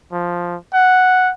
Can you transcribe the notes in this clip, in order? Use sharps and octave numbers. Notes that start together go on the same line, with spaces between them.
F3
F#5